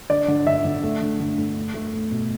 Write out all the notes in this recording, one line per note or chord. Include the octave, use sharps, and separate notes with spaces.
D3 D5
D3
D3 E5
D3
A3
D3
D3
A3
A3
A3
A3
B2